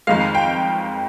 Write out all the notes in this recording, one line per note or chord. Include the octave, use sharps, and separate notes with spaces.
F2 D#3 G#3 F5
G5